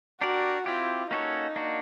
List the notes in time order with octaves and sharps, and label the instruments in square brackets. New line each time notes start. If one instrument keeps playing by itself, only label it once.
[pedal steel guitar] D4 G4 A#4 D5 [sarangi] F#4
[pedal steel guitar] C4 E4 G4 [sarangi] F4
[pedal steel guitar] A#3 C#4 F#4 A4 C#5 [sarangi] D#4
[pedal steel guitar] A#3 D4 F#4